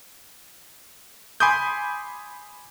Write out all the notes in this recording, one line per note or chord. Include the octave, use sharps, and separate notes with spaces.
G#5 B5 C6 D6 D#6 G6